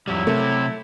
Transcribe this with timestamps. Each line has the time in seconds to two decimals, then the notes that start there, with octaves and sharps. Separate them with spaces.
0.08 F2 F#3 G3 E4
0.27 C3 A3